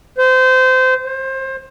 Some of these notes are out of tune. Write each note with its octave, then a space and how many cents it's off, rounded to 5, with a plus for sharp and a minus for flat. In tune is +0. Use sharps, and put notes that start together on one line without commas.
C5 -25
C5 +25